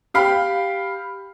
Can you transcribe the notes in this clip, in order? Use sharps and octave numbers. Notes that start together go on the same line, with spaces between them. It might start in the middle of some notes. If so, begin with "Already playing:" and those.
G4 F5 G5 B5